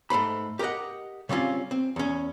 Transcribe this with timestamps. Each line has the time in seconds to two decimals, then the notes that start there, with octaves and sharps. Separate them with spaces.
0.10 G#2 A3 C5 B5
0.59 G4 A#4 B4 D#5 F#5
1.29 C#3 G3 C4 C#4 F4
1.71 C4
1.96 E2 C#4